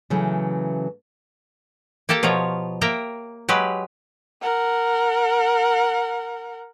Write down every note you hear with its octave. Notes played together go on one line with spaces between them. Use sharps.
C#3 E3 F#3 A3
A#3 G4 A4 A5 A#5
B2 F3 F4 C#5 A#5
A#3 A#4 E5 G5 A#5
F#3 G#3 G4 B4 F5
A#4 F#5